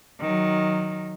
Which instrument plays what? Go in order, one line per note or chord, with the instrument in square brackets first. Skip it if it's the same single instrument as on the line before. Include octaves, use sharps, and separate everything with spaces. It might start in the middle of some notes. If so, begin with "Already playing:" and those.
[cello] D#3 F#3